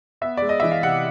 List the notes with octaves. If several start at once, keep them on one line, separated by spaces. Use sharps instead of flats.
B3 E5
G#3 D5
D#5
E3 E5
F5
C3 F#5